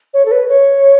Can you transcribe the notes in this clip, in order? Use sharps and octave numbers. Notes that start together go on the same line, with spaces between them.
C#5
A4
B4
C#5